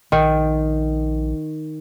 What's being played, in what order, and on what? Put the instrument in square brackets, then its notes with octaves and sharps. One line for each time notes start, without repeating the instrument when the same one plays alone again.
[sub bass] A#1 [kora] D#3